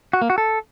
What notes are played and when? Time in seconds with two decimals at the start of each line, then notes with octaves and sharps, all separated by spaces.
0.13 F#4
0.22 A#3
0.30 F#4
0.38 A4